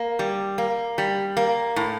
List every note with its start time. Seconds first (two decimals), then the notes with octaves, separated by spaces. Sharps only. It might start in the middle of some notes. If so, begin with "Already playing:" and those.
Already playing: A#3
0.19 G3
0.58 A#3
0.98 G3
1.37 A#3
1.76 A2